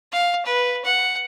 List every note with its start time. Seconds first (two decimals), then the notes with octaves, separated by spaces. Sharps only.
0.12 F5
0.46 B4
0.85 F#5